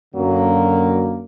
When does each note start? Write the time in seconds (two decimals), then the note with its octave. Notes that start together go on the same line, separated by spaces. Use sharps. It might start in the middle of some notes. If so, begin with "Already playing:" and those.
0.14 F#2 D3 F#3 A#3